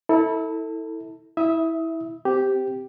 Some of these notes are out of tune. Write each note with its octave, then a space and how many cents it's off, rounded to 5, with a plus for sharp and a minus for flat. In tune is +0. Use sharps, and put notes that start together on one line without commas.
E4 -30 A4 +20
E4 -20 E5 +0 D#6 +20
C4 +0 G4 -5